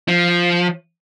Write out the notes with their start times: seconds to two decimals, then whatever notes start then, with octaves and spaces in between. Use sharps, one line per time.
0.08 F3